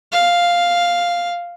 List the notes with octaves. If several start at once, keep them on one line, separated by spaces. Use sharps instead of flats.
F5